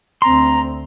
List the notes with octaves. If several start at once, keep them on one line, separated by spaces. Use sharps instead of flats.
D2 C4 A#5 C6